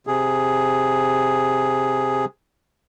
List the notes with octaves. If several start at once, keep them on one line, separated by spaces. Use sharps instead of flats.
C3 G#4